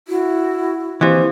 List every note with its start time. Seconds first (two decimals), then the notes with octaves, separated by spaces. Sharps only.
0.08 E4 F#4
1.01 E3 A#3 C4 G4 C5